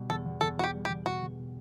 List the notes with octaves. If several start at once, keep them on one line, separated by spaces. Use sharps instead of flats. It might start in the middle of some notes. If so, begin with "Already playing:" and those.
Already playing: B2 G3
E2 A4
E2
E2 A4
E2 F#4
G4
G3
G4
E2
B2 F#4
E2
B2